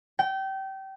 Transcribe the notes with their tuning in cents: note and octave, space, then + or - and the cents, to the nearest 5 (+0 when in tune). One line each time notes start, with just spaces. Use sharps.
G5 -25